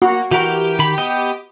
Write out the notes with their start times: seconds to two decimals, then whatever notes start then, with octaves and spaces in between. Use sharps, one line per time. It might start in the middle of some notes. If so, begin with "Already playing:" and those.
0.02 A#3 F#4
0.31 E3 F#4 G4 A#4
0.79 D#3 B5
0.98 B3 D#5 G5